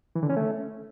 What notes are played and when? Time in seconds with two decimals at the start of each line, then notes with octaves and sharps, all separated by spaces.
0.15 E3
0.22 D3
0.29 C#4
0.36 A3